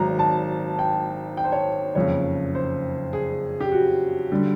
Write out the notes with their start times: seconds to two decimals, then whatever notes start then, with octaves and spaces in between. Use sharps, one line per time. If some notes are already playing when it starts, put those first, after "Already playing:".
Already playing: G#1 G#2 D#3 F#3 A#5
0.19 A5
0.79 G5
1.37 G5
1.44 C5
1.52 C#5
1.95 F#1 F2 C#3 C#5
2.55 C5
3.13 G#4
3.61 G4
3.72 F#4
4.32 D3 G3